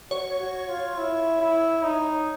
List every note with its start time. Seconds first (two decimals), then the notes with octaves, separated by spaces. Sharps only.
0.11 F#4 C#5
0.40 F#4
0.68 F4
0.98 E4
1.41 E4
1.83 D#4